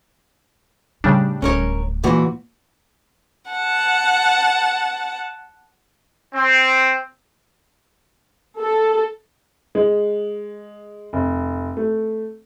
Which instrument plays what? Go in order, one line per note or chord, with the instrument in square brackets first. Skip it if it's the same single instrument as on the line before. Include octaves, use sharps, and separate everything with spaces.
[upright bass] A2 [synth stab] C#3 G3 D4
[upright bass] D1 [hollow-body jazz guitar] C#4 A#4 C#5
[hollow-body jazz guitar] A#2 E3 F#4 [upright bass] A#3
[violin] F#5 A5
[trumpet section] C4
[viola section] A4
[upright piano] G#3
F1
A3